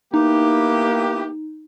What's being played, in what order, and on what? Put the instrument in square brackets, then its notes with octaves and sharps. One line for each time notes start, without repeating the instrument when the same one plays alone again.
[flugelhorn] A#3 [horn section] B3 E4 G4 [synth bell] D#4